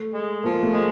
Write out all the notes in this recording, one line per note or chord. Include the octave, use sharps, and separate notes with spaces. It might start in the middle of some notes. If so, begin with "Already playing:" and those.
Already playing: A3
G#3
F3 A#3
A3
G#3